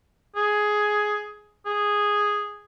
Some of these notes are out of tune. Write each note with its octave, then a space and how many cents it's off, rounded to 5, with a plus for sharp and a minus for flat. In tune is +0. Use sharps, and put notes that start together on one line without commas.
G#4 +10
G#4 -5